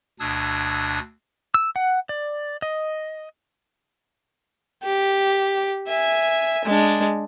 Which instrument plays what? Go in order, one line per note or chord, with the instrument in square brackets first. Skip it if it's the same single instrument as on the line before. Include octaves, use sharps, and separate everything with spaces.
[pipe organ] D2 B2 D4 D#6 E6 G#6
[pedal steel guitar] E6
F#5
D5
D#5
[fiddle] G4
E5 G#5
G#3 D4